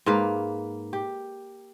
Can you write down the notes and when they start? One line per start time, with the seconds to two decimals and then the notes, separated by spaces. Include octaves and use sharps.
0.06 G#2 A#3 B4 F5
0.93 G4